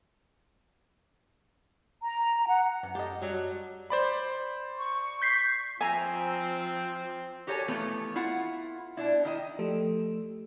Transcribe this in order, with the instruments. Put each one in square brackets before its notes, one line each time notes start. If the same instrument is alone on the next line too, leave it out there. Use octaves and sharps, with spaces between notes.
[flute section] A#5
F#5
[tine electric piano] F#2 [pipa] C3 E3
[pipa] F4 A4 D#5 [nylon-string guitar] G4
[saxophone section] F#3 [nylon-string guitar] G3
[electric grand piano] C5 D5 B5
[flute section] C#6
[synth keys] G6 B6 C7
[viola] F3 [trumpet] C4 [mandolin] E5 A#5 [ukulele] G#5
[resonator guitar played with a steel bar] F#4 G4 A4 A#4 C#5 G#5
E3 F3 A3 B3
E4 F4 F#5
B2 D4 E4
D#3 E4 D#5
[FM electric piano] F3 A3 G4 A4